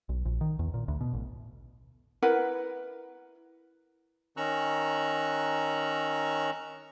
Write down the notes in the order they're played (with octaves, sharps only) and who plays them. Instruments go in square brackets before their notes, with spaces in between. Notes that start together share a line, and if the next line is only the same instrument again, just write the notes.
[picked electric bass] B1
A#1
D#3
E2
A#2
D2
B2
A1
[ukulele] E4 A#4 B4 F#5
[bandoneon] D#3 C#4 A#5 C#6 E6 F#6